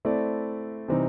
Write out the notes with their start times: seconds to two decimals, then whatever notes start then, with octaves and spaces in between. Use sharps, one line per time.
0.05 A3 C4 E4 A4 D5
0.88 C3 E3 G3 C4 D#4